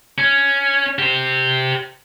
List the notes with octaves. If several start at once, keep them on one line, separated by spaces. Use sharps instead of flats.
C#4
G4 C5